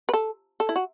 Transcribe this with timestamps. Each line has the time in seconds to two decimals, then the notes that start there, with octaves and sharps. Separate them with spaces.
0.09 B4
0.14 A4
0.60 A4
0.69 E4
0.76 F#4